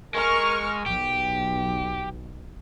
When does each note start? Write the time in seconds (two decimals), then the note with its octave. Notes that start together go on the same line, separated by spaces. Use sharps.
0.15 G#3 A#4 C#6 F6
0.86 B1 G4